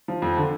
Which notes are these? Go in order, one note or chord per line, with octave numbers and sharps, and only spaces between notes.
F3
F2
D3